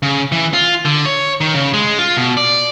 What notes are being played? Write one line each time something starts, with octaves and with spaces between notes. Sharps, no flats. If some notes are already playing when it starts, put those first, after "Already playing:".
C#3
E3
F4
D3
C#5
D#3
C#3
G#3
F4
B2
D5